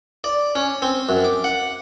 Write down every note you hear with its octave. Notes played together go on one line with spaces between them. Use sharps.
D5
C#4
C4
F#2
D6
F#5